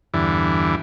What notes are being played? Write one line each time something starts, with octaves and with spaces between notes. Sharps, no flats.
E2 G2 D3 E3